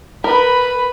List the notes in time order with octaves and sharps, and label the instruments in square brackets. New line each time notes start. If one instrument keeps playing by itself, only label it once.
[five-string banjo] A#4 [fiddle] B4 B5